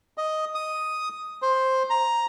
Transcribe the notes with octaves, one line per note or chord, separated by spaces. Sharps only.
D#5
D#6
C5
A#5